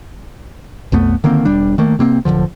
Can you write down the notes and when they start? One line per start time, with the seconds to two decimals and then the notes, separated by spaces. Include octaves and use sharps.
0.92 B1 F2 A3 B3
1.24 D3 D#3 A#3 C4
1.45 E1 G3 D4
1.78 D#3 A3 A#3
1.99 C3 A#3 C4
2.25 D1 F2 D3 F3